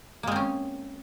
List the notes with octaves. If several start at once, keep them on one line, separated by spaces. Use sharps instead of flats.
G#3 A#3 C4 C#4